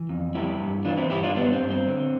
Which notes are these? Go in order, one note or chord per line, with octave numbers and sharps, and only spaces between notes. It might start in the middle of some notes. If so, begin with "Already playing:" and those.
Already playing: E3
F2
G3 E4 G4
G2
E3 D4 F4
C4 E4
G2 E4 G4
D4 F4
G3 B3 D4
C4
G2
C4
D3